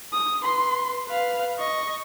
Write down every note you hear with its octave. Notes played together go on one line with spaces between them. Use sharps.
D#6
B4 C6
B4 F5
D#5 C#6